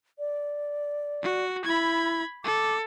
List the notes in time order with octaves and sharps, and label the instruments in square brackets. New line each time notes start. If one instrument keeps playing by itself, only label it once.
[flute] D5
[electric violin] F#4
[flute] E4 [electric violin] B5 G#6
[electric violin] A4 [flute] D6